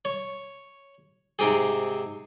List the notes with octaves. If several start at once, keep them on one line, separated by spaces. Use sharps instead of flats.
C#5
G#2 C3 C4 G4 G#4